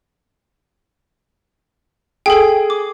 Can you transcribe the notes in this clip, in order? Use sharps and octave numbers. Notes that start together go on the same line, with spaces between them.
G#4 A4 G5
D6